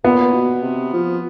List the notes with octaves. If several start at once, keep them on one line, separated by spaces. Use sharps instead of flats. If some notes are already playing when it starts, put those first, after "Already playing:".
A#2 B3
B2
C3
F3